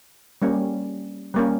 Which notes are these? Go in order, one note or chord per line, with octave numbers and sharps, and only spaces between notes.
G3 A#3 C#4
G3 A#3 C#4